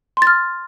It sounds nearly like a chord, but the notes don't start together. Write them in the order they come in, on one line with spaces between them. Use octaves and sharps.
C6 A6 F6